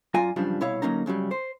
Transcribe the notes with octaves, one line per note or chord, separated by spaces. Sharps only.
F#2 F4 D5 G#5 A#5
F#2 C#3 F3 G3 D4
C2 B2 E4 C#5 F5
D2 F#3 A#3 C#4 D#4 A#5
C#2 C#3 F#3 G3
C5